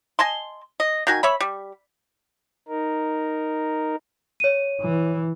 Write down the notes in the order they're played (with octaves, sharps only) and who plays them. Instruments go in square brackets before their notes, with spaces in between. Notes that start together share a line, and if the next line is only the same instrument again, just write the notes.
[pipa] D#5 G#5 A5 C6
D#5
D#3 F#4 G#5
C#5 E5 B5
G3
[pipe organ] D#4 A#4
[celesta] C#5 D#7
[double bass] E3